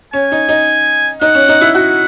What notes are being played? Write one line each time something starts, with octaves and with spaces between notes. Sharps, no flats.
C#4 G#5
D#4
D#4
D#4 F#5
C#4
D#4
E4
F#4 F#5